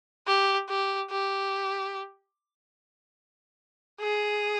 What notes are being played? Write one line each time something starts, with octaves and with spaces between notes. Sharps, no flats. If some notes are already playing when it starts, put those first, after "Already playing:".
G4
G4
G4
G#4